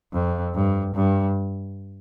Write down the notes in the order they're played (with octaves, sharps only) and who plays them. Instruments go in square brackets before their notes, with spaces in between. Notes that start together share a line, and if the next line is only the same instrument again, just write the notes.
[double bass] F2
G2
G2